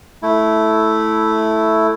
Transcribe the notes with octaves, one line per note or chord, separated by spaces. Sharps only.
A3 E4